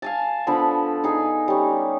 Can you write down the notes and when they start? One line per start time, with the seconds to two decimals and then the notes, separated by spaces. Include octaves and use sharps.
0.02 F5 G#5 A5
0.47 D3 F3 B3 B5
1.04 D#4 G#4
1.48 G3 C#4